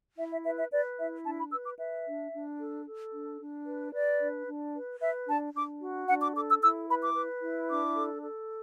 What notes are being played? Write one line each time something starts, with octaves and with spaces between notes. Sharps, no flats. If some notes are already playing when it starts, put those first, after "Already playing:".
E4 E5
E5
B4 E5
E5
B4 D5
E4 E5
D4 A5
B5
B4 E6
D6
B4 E5
D4
D4
A4
A4
D4
D4
B4
B4 D5
D4
D4
B4
B4 E5
D4 A5
D4 D6
F#4
D4 F#5
D6
A4 D6
E6
E4 E6
B4 B5
D6
B4
E4
D4 D6
A4
A4